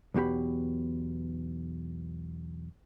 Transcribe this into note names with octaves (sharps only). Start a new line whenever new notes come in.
B1 E2 B2 G4 B5